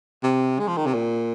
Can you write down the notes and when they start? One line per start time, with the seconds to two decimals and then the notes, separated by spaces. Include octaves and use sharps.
0.24 C3
0.60 G#3
0.68 F3
0.77 D#3
0.86 C3
0.94 A#2